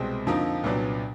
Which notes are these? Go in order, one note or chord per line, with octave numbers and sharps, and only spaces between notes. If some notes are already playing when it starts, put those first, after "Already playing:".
Already playing: C2 B2 G#3 C4
F2 D3 F3 A#3 D#4
C2 A#2 F#3 B3 D4